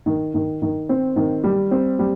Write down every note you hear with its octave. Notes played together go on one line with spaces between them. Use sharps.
D#3
D#3
D#3
C4
D#3
G3
C4
G3